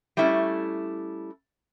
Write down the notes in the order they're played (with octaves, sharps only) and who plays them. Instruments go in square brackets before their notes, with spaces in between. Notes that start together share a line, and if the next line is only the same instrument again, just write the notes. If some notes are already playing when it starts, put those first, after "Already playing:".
[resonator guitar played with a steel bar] G3 A3 C#4 E4